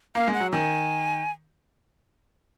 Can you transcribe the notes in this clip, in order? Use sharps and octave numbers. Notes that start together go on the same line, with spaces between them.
A#3 F5
G#3
F#5
F#3
D#3 G#5